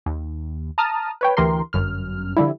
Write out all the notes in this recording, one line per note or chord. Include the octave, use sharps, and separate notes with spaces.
D#2
A5 A#5 D#6 F6
B4 C#5 G5
D2 E3 G4 A#4 C6
G1 F#2 F6
D3 F3 G3 E4